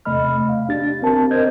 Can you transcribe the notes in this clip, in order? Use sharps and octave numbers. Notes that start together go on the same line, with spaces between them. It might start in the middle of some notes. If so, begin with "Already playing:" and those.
E2 C3 A3 D#5 B5 F6
F5
D4 G4 A6
C4 G4 A#4 A5
A#4 C5 D#5 G6 G#6